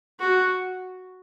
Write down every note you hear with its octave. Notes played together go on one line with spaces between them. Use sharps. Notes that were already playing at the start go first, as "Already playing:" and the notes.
F#4